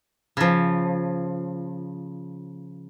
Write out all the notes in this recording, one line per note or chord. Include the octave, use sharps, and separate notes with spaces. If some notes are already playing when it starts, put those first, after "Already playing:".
C#3 F3